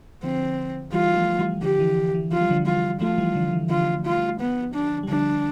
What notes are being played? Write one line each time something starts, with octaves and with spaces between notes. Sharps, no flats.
D3 F3 C4
E3 G3 F4
F3 A3
E3 G3
D3 F3 G4
E3
E3
F3 F4
G3
D3 F3
E3 G3 F4
F3 A3 F4
E3 G3
D3 F3
E3
D3 F3 F4
F4
B3
D4
G3
D3 F3 D4